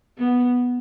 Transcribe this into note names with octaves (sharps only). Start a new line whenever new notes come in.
B3